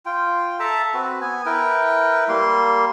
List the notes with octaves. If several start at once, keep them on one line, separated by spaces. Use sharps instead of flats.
F4 G5
A4 E5 A5 A#5
C4 F#4 B4
B3 G#5
E4 A#4 B4 G5
G3 A#3 C6